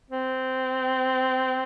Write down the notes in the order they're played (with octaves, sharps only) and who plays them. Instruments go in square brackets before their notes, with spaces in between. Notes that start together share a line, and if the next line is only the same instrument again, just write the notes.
[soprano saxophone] C4